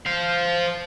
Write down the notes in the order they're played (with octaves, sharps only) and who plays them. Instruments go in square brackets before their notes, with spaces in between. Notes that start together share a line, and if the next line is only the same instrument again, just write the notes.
[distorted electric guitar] C5 F5